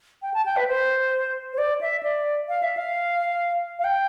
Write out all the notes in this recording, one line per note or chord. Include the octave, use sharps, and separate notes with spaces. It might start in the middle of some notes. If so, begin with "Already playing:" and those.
G5
A5
G5
B4
C5
C5
D5
E5
D5
F5
E5
F5
F5
G5